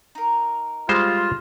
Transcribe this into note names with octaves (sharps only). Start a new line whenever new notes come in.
D#4 A#4
G3 G#3 F4 C5